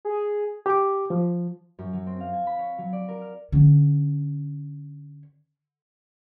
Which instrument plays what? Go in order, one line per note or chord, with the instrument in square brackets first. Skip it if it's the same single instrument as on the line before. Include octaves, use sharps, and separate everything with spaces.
[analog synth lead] G#4
[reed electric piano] G4 D6
F3
[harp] F#2
F#3
C4
F5
G#5
B5
C#5
F#3
D5
A#4
F6
[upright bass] D3 C#4